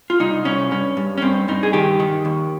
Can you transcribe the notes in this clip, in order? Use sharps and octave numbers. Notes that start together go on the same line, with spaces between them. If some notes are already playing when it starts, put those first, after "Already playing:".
F4
C2 D#4
C2 C#4
G2 C#4
G2
C#4
G2 C4
G2 D#4
G#4
D#3 G4
D#3
D#2